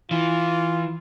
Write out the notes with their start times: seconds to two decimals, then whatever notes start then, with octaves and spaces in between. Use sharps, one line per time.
0.11 E3 F4